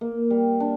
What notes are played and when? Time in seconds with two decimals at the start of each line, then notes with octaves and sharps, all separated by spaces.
0.01 A#3
0.30 G3
0.60 D4